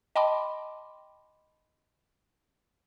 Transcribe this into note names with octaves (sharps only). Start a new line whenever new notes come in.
D#5 G5 A5 B5 C6 D6